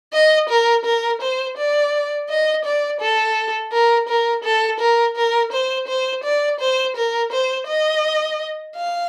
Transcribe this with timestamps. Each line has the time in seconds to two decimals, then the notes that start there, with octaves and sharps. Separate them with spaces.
0.13 D#5
0.49 A#4
0.85 A#4
1.21 C5
1.57 D5
2.29 D#5
2.65 D5
3.01 A4
3.72 A#4
4.08 A#4
4.44 A4
4.80 A#4
5.16 A#4
5.52 C5
5.88 C5
6.24 D5
6.60 C5
6.96 A#4
7.32 C5
7.67 D#5
8.75 F5